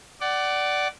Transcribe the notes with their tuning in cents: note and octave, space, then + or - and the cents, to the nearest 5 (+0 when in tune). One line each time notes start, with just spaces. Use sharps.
D5 +0 F#5 +30